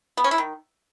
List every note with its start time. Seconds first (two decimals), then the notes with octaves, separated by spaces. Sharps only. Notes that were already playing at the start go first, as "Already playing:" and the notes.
0.17 B3
0.24 C#4
0.31 E4
0.38 D#3